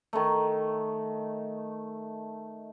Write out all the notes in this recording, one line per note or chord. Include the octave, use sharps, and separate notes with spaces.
D#3 A3